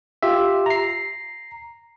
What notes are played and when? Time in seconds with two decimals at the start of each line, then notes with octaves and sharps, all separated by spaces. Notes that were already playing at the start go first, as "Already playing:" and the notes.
0.23 F4 G4 E5
0.66 A#5 C7